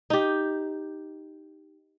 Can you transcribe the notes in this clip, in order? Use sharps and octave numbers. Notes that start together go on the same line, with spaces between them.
D#4 G4